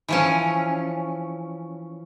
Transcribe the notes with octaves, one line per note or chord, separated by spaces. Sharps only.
E3 F3 C#4